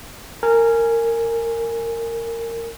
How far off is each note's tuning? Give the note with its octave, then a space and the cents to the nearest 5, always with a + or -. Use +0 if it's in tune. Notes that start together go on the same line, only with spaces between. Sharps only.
A#4 -20 G#5 +0